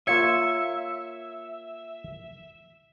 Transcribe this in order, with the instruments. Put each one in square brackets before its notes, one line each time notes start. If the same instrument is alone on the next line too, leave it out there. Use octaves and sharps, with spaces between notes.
[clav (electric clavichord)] A#3 F4 C#5 [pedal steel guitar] E5 [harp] G#6 C#7 E7